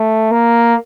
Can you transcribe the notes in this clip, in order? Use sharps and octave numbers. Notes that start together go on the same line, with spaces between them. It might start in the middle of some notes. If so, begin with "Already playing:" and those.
Already playing: A3
A#3